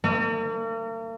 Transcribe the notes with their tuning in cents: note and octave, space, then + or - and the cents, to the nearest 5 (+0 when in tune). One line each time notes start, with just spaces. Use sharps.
A#3 -45